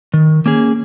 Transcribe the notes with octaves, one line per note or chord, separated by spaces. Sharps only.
D#3
A#3 C#4 G#4